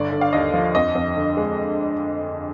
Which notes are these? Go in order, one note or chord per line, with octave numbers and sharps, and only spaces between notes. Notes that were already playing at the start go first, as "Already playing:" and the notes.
Already playing: G1 D3 D5
D3
F5
D#2 D#5
F3
F2 D#5
F2
D3
G#3